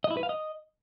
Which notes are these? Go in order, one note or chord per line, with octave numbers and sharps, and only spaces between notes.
D#5
E4
B4
F5
D#5